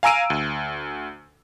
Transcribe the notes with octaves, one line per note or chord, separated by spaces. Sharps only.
F5 G#5 A#5 E6 D7 D#7
D2